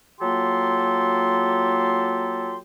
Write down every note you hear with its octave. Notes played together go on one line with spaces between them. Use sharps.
F#3 A#3 F4 G4 A4 C6